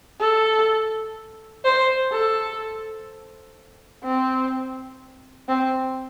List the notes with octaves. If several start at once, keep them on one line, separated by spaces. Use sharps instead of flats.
A4
C5
A4
C4
C4